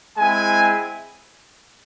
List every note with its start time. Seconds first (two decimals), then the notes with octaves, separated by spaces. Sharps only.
0.17 G#3 C4 E4 G#5